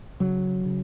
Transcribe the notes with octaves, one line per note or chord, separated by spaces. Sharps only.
C#3 F#3
C#3